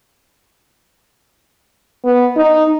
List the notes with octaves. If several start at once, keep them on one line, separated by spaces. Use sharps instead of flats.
B3
D#4